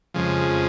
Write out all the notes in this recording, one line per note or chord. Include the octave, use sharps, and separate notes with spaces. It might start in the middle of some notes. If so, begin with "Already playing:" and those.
F2 C#3 F3 G#3